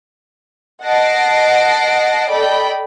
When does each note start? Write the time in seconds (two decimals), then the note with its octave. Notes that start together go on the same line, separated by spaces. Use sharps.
0.83 D#5 F#5 A5 A#6 C7 D7
2.30 A4 D5 D#5 G5 B5